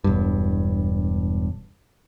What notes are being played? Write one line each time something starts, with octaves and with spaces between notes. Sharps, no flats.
E1 G2